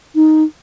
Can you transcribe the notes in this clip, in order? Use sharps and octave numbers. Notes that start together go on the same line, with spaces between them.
D#4